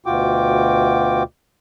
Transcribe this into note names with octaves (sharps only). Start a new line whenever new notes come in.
D2 B2 F4 F#4 G5 D6